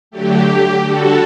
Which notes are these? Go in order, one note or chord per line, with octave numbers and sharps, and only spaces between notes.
D3 F#3 A3 G4
D3 G3 F#4 A4